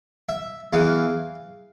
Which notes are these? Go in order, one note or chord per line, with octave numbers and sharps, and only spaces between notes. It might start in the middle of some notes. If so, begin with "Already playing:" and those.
E5
E2 E3 F5